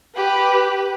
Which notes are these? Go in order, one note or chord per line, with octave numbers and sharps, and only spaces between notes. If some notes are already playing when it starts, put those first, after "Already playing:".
G4 B4